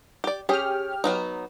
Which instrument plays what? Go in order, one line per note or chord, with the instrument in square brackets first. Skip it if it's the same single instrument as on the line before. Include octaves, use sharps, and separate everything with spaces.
[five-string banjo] G4 D5
[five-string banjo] C#4 G#4 [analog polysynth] G4 F6
[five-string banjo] F#3 B3 D#4